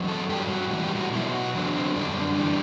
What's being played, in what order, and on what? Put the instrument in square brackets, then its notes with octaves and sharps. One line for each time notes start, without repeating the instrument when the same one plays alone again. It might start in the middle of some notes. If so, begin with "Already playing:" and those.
Already playing: [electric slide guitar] E2 F#3
A4
G2 F#3 G4
F#4
A2 E3 G3 F#4
G4
F#4
B2 F#3 E4
F#4
E2 D3 F#3 F#4
C4
F#2 D3 G3 D4
E3 G3